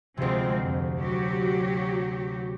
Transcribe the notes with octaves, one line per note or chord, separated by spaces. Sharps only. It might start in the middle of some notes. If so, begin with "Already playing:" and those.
D2 C3 F3 G#3 C4
F2
F#3 F#4 G4